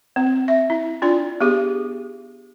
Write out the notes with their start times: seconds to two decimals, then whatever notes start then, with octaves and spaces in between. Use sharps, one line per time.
0.16 C4
0.48 E5
0.70 E4
1.02 D4 F4 D5
1.41 B3 G4 G#4